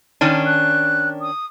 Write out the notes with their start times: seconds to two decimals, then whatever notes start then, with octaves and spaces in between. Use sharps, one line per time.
0.21 D#3 C#4 D4
0.46 F#6
1.21 D#6